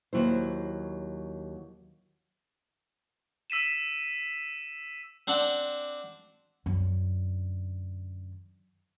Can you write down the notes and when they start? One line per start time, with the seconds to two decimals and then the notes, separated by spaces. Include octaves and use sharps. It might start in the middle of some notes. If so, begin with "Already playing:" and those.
0.13 D#2 F#3 E4 C5
3.50 E6 B6 D#7 E7
5.27 C4 D4 D5 F#5
6.66 F#2 D3